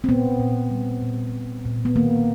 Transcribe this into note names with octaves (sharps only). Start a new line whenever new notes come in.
C4
A#2 B3
A#2
G3
A#2
A#2
A#2
B3
D#3 A#3